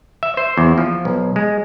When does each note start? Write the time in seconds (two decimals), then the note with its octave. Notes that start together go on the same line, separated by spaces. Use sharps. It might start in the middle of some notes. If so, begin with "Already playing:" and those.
0.23 E5
0.37 C5
0.57 E2
0.78 F3
1.05 B1
1.36 G#3